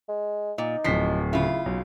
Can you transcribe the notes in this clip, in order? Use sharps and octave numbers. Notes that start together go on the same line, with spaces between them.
G#3
A#2 D#4
D1 F3 B6 C7
C#3 E4 F4
B1